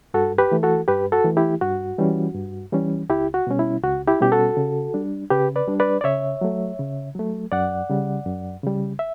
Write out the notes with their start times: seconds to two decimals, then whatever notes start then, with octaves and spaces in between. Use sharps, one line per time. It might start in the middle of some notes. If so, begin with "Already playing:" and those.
0.14 G2 F#4 A4
0.38 G4 B4
0.52 E3 A3
0.63 F#4 A4
0.88 G2 G4 B4
1.12 F#4 A4
1.25 E3 A3
1.37 E4 G4
1.61 G2 F#4
1.98 E3 G3 C#4
2.35 G2
2.72 E3 G3 C#4
3.09 C#2 E4 G4
3.34 F#4
3.47 B2 G3 C#4
3.59 E4
3.84 C#2 F#4
4.08 E4 G4
4.20 B2 G3 C#4 G4
4.32 F#4 A4
4.57 C#3
4.94 G3 D4
5.30 C#3 G4 B4
5.56 B4 D5
5.68 G3 D4
5.80 B4 D5
6.01 D5
6.04 C#3 C#5 E5
6.41 F#3 A3
6.79 C#3
7.15 F#3 A3
7.52 F#2 D5 F#5
7.90 C#3 G3
8.26 F#2
8.63 C#3 G3
8.99 E5